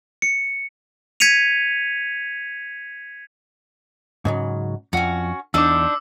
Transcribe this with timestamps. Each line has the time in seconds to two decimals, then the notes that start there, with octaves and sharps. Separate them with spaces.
0.22 C#7
1.20 G#6 B6 C#7 D#7 F7
4.25 G#2 C#3 F#3
4.93 F2 C#4 F#4
5.54 E2 D4 D#4 C5 D6 E6